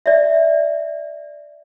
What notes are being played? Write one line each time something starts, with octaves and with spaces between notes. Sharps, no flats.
D5 E5